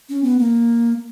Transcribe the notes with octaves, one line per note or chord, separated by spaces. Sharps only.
C#4
B3
A#3